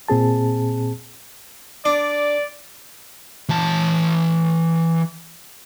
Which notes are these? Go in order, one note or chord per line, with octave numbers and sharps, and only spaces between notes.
A#2 C4 G#4 A5
D4 D5
E3 A5